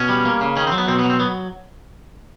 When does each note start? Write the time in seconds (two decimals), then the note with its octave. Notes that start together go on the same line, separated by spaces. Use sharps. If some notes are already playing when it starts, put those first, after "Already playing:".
Already playing: B2 C#4
0.09 G3
0.25 A#3
0.41 C#3
0.57 D#3 C#4
0.67 C4
0.72 F#3
0.78 B3
0.88 B2 C4
0.99 B3
1.04 F#3
1.10 C4
1.20 F#3 B3